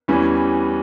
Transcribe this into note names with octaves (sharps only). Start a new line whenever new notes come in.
E2 E3 G3 C#4